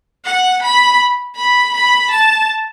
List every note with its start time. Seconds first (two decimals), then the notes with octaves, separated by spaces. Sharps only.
0.25 F#5
0.62 B5
1.36 B5
1.74 B5
2.10 A5